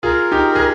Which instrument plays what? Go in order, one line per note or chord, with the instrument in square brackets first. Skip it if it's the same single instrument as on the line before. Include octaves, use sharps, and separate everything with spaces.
[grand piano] F4 G#4 [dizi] A#4
[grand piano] D#4 G4
G#4